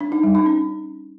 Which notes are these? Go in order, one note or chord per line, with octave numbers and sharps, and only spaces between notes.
D4
D#4
G3
D#4
C#4